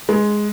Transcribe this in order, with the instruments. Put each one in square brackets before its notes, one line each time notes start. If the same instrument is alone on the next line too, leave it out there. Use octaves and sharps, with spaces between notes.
[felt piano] G#3